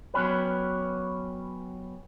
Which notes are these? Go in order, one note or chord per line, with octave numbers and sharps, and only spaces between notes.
F#3 B3 C#4 G4 B4